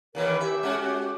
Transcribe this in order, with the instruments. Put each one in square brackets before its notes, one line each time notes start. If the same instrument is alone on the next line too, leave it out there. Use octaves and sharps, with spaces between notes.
[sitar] D#2 D#3 E3 [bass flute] A#4
[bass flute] G4 [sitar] E5
[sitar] G#3 C#4 F#4